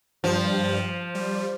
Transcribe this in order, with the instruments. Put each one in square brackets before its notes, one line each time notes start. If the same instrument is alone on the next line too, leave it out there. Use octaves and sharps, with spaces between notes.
[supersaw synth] G2 G3 [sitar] F3
[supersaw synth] G3